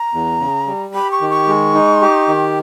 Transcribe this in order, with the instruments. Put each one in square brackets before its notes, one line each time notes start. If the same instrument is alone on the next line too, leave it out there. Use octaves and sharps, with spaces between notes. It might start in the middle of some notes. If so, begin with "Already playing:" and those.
Already playing: [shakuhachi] A#5
[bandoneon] E2
C#3
G3
[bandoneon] G4 [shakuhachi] B5
[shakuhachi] C#6
[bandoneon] D#3
[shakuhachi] C#6
[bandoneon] G#3
D#4
G4
D#3